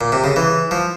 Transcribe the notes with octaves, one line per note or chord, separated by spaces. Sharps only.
A#2
C3
C#3
E3
F3